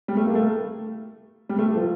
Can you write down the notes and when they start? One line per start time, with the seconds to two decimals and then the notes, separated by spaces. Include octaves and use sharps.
0.08 G3
0.17 A3
0.26 A#3
0.35 A3
1.49 G3
1.58 A3
1.76 F3